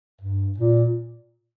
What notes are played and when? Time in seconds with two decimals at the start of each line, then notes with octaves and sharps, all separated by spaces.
0.21 G2
0.58 A#2